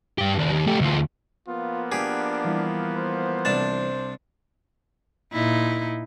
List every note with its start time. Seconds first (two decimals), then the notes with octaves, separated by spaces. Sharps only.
0.18 G2 G4
0.39 D#2 D4
0.52 D#2
0.67 A3 G4
0.81 D2 F4
1.47 F3 A#3 B3 F4
1.92 D4 G4 G#4 F#5
2.45 E3 G3 E4
2.96 C5
3.45 C2 D4 A5
5.33 A#2 D#4 E4